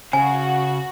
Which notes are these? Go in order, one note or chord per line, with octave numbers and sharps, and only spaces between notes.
C#3 F#4 G#5